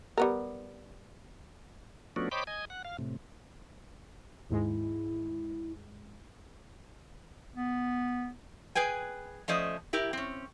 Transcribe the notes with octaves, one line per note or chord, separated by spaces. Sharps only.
G3 B3 A#4
F3 A3 B3 C#4 D4 F#4
C5 C#5 D#5 G5 B5 D6
D#5 G#5
F#5
F5
A2 C3
D#2 G#2 G#3 E4
B3
G#4 B4 G5 G#5
F3 A3 C#4 C5 D5 D#5
E4 G4 A#4
C4 C#4